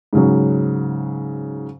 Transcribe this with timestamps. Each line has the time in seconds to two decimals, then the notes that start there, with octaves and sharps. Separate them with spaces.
0.13 G#2 C#3 F#3